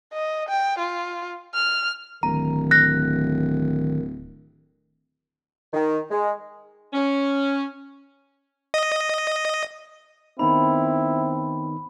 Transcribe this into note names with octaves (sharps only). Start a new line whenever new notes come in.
D#5
G5
F4
F6
D1 D#3 A#5
F#6 A#6
D#3
G#3
C#4
D#5
D#3 B3 C4 D#4 E4 B5